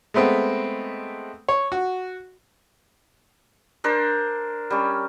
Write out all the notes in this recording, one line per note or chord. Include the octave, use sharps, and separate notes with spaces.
G#3 A3 B3 C4
C#5
F#4
D4 A#4 C5
G3 C#4